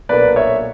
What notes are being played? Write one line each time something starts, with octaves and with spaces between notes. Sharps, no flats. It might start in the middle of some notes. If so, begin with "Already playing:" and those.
B1 A#2 A#3 D4 B4 D5
C#5 E5